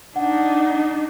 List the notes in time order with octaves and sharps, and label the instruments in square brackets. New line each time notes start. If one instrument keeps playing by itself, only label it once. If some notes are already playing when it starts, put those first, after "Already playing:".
[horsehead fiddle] D4 D#4 [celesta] F#5